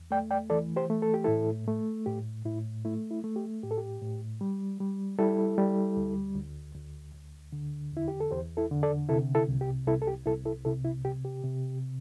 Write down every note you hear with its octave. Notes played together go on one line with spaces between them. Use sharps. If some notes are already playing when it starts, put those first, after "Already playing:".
Already playing: E2
A3 D5 G5
D5 G5
E3 A4 D5
G4 C5
A3
A4
G4
A2 E4 A4
A3
A2 G4
A2 E4
A3 E4
E4
A3
G4
A2 G4
A4
G4
A2
G3
G3
G3 E4 A4
G3
D2
D2
D2
D2
D3
E2 E4
G4
A4
E2 G4 C5
E4 A4
D3
A4 D5
C3 E4 A4
E4 A4
C2
G4
C2 E4 A4
A4
G4
C2 E4 A4
E4 A4
C3 E4 A4
E4
C3 G4
G4
C3